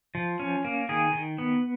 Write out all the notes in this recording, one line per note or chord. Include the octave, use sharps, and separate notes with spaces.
F3
C#4
A#3
D#3 G#4
D#3
B3